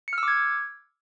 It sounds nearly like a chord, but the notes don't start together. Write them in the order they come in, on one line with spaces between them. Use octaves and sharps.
C#7 F6 E6 D6 G#6